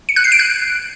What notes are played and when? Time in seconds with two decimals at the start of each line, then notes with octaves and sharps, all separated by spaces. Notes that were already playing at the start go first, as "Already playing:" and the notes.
0.09 C#7
0.16 F#6
0.24 C7
0.32 D7
0.39 F#6